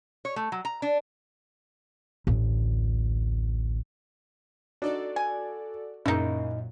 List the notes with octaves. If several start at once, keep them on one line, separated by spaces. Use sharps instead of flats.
C#5
A3
F#3
A#5
D4
A1 D2
D4 D#4 F#4 A4 D5
G#5
F#2 A#2 C#3 A#3 D#4 E4